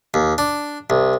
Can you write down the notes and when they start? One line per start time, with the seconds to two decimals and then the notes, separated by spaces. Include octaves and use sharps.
0.14 D#2
0.38 D4
0.90 C2